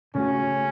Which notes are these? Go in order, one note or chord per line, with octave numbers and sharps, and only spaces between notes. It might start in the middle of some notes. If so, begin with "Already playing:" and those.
C#3 A3 C#4 F#4